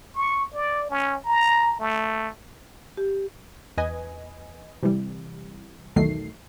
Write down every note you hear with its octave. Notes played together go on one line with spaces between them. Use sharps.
C#6
D5
C#4
A#5
A3
G4
E2 B4 D#5 G#5
C3 E3 G3
B1 E2 D#3 F#3 A3 C7